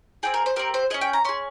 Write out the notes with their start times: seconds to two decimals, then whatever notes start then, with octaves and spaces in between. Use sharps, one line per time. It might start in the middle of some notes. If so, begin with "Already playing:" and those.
0.23 C4 D#4 G#4 G5
0.34 A#4
0.46 C5
0.56 C4 G4 A#4
0.74 C5
0.90 G#4 D#5
0.94 C#4
1.01 G5
1.13 A#5
1.25 C#4 G#4 C6